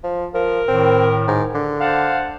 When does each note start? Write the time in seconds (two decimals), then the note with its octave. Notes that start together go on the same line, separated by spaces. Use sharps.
0.04 F3
0.34 F3 A#4
0.68 A2 D#3 C4
1.28 G#2
1.55 D3
1.80 C5 F5 F#5 A5